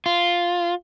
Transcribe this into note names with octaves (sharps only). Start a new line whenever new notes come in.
F4